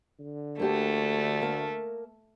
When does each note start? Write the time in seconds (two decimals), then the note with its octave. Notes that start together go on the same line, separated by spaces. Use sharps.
0.19 D3
0.60 D2 A3 A#3 G4 A5
1.41 A#3 A#4 A5